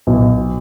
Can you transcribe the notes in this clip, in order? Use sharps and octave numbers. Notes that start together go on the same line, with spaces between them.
B1